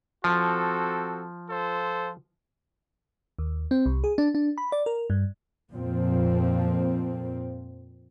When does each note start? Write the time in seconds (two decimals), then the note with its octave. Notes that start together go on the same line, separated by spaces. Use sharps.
0.24 F3 C4 F#4 A4
1.49 F4 A4 C5
3.39 D#2
3.71 C4
3.86 C2
4.04 G#4
4.18 D4
4.35 D4
4.58 B5
4.72 D5
4.86 A#4
5.10 G2
5.72 F2 A#2 F3 C4